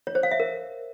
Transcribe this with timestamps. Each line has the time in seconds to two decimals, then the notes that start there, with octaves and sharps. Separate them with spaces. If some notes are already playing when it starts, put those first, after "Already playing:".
0.07 C#5
0.15 C5
0.23 F5
0.31 E5
0.40 A#4